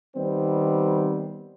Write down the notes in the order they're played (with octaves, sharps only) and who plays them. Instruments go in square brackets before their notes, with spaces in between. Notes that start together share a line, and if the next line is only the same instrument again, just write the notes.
[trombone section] D#3 G3 B3 C4